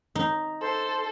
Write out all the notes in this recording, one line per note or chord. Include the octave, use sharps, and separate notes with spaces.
D#4
A4 C5